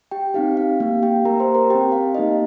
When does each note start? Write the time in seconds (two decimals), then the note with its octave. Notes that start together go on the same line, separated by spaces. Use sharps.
0.11 G4 G5
0.34 C4 D#4 G4 F5
0.57 F5
0.80 A#3 G4 F5
1.03 G4 G5
1.25 A#3 G4 A#4 A#5
1.40 C5 C6
1.54 A#4 A#5
1.70 G4 G5
1.74 C4
1.92 F5
2.15 A#3 D#4 G4 D#5